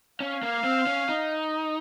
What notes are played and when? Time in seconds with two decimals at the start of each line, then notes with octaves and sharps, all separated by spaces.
0.20 C#4 F5
0.43 A#3
0.64 C4
0.87 C#4
1.09 D#4